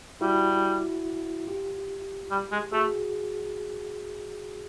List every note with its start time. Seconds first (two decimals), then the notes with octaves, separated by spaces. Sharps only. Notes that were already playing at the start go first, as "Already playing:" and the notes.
0.21 G3 E4 F#4
1.47 F4 G4
2.31 G3
2.52 G#3
2.72 A3 F#4 G#4